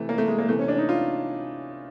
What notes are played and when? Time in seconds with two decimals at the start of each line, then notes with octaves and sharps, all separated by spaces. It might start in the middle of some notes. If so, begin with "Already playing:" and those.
Already playing: C3 E3 A3
0.09 A#3
0.18 A3
0.28 G#3
0.38 A#3
0.48 C3 E3 A3
0.59 C#4
0.68 D4
0.78 D#4
0.89 F4